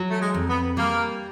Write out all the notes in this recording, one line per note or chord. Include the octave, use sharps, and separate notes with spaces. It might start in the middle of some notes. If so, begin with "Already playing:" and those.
Already playing: F#3
A3
G#3
F2
B3
G3 A#3